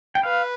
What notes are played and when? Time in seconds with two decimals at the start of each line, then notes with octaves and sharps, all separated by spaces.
0.15 G5
0.23 B4 F5